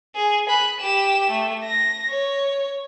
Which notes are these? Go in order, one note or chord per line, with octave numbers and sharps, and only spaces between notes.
G#4
B5 F#6
G4 E7
A3
A#6
C#5